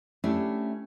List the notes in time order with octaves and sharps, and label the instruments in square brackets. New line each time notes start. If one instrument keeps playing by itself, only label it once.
[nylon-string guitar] A3 C#4 D4 E4 G4